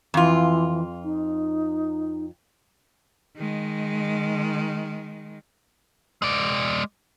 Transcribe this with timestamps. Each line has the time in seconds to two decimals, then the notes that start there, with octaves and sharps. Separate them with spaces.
0.14 F2 E3 F4
1.04 D#4
3.37 D#3 G#3
6.22 G#3 D5